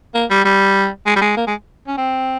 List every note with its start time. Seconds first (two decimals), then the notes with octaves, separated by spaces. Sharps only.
0.14 A#3
0.30 G3
0.45 G3
1.06 G#3
1.16 G3
1.21 G#3
1.37 A#3
1.47 G#3
1.87 C#4
1.98 C4